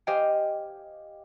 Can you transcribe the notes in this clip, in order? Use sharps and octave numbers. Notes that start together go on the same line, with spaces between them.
G4 C5 D#5 F5 G5 G#5